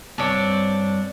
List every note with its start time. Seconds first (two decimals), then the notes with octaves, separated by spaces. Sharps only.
0.18 G2 C4 D4 C#5 D5